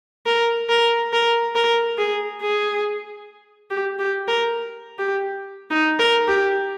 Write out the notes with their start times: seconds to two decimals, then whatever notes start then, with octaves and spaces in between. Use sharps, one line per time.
0.26 A#4
0.69 A#4
1.13 A#4
1.55 A#4
1.98 G#4
2.42 G#4
3.70 G4
3.99 G4
4.28 A#4
4.98 G4
5.71 D#4
5.99 A#4
6.28 G4